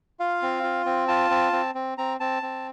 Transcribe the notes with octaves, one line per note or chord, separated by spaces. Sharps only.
F4 F5
C4
F4
C4
F4 A5
C4
C4
C4
C4 A#5
C4 A5
C4